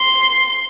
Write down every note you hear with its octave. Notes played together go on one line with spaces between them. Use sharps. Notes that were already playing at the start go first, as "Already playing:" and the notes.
Already playing: C6